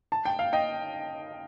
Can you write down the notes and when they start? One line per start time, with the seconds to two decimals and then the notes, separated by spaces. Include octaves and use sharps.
0.12 A5
0.25 G5
0.39 F5
0.53 D#5 G5